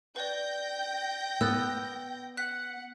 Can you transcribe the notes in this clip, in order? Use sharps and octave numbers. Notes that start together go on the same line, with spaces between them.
B4 D5 G5 G6 A#6
B3 E6 F#6 A6
F#5 F#6 B6